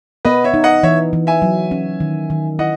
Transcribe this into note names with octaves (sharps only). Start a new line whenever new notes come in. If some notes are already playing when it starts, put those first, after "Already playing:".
B3 B4 D#5
C#5 E5
D#4
D#5 F#5
E3 C#5 E5
E3
E5 G#5
F#3
C#4
D#3
D#3
E4 D#5 F#5